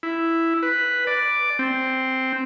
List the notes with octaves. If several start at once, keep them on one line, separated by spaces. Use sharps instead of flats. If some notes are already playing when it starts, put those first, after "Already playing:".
E4
B4
D5
C4